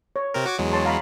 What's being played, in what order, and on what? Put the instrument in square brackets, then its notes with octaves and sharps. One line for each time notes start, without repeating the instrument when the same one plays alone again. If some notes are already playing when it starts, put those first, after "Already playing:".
[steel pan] C#5
[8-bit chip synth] C3 C4 A#4
F#4 D6 G#6
E2 F#3 G#3
[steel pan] C#5 A5 C6
F5 A#5 B5